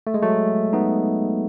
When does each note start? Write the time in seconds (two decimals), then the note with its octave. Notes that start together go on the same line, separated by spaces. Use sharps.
0.07 A3
0.14 G#3
0.23 F#3 A3
0.73 B3 D#4